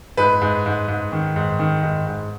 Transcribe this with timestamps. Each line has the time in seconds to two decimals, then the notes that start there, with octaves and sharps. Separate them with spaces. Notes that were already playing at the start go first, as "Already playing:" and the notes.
0.17 G#2 B4
0.41 G#2
0.66 G#2
0.88 G#2
1.12 D#3
1.36 G#2
1.59 D#3
1.83 G#2
2.07 G#2